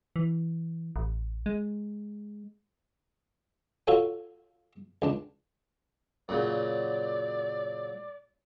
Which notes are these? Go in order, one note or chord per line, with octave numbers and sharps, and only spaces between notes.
E3
A1
G#3
F4 F#4 A4 C#5 G5
C#2 D4 A5
F#2 A#2 C#3 D5